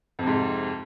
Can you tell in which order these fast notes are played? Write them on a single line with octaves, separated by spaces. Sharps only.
F2 C3 G#2